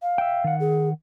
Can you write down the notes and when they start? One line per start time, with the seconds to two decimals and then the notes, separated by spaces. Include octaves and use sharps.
0.02 F5
0.18 E5 G5
0.44 D#3 F#5
0.60 G#4